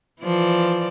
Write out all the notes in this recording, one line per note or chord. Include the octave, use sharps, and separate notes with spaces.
E3 F3 D5